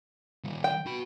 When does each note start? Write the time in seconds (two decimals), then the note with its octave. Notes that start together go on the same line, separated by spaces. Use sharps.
0.44 D#3 G3
0.64 G5
0.86 F#4 B5